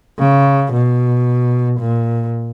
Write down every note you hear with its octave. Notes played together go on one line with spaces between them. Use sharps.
C#3
B2
A#2